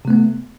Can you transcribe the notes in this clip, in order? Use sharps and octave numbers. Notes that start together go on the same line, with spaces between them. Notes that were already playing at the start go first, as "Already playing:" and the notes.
C3 A3 B3